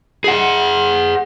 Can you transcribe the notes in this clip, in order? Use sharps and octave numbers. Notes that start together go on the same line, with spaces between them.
G#4 F#5